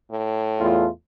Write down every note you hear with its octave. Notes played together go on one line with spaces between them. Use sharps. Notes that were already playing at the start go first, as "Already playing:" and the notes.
A2
E2 A3 F4